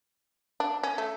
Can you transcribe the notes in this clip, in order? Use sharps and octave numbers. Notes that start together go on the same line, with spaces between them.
D4
C#4
A3